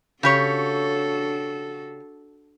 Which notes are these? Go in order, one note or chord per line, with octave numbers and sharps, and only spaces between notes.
C#3 D4 F#4 G4 A4 C#5